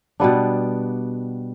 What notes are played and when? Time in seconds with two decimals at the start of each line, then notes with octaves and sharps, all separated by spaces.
0.20 B2 G3 B3 D4